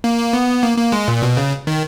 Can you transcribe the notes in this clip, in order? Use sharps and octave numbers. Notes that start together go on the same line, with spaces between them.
A#3
B3
A#3
A#3
G#3
A#2
B2
C#3
D#3